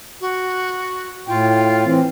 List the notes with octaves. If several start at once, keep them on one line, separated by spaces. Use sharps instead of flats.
F#4
A2 F4 G5
E3 C4